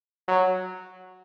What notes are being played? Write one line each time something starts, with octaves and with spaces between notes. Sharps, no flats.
F#3